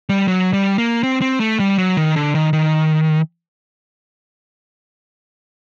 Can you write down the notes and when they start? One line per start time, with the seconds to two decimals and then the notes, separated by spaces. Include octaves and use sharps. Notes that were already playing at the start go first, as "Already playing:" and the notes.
0.09 G3
0.28 F#3
0.53 G3
0.78 A#3
1.03 C4
1.22 C4
1.40 A3
1.59 G3
1.78 F#3
1.97 D#3
2.16 D3
2.35 D#3
2.53 D#3